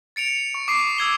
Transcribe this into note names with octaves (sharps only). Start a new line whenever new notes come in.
A6 C#7 D7 F7
C#6
D6 D#6 C7 D#7
D#6 E6 G#6 G7